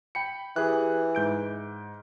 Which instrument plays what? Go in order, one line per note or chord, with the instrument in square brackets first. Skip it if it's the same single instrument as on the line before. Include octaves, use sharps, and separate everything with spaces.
[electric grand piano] G5 B5 C#7
[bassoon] E3 [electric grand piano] G4 G#4 F#6
[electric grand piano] G#2 G6 D7